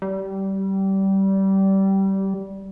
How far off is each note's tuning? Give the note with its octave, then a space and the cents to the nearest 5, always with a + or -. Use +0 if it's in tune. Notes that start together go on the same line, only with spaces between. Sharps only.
G3 -20